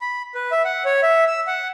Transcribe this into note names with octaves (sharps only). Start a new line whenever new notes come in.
B5
B4
E5
F#5
C#5
E5
E6
F#5